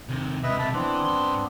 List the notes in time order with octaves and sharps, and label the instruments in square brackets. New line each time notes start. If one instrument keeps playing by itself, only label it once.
[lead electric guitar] C3 D#3
[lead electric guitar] C3 G#3 [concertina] B4 D#5 E5
[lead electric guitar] B1 C3 [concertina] E5 A5 B5
[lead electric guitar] E3 [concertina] B3 C4 D4
[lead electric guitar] G2 C6